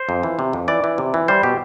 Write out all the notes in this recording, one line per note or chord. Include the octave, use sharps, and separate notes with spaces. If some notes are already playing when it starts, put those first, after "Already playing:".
Already playing: C5
F2
E3
C3
F2
E3 D5
E3
C3
E3
G3 C5
B2 G4